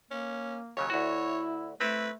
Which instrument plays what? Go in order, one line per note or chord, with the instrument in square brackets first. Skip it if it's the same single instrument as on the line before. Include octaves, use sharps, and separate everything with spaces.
[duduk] A#3 [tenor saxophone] C#4
[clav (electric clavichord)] D#2 C#3 F#3 [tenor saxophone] C#5
[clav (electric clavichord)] D2 F#4 [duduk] E4
[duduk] A3 [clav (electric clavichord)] C4 E4 [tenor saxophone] B4